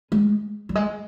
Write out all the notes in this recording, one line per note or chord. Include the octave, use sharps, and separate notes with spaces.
G#3
G3
G#3